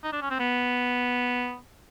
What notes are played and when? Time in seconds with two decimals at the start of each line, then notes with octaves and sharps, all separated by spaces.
0.03 D#4
0.12 D4
0.22 C#4
0.30 C4
0.39 B3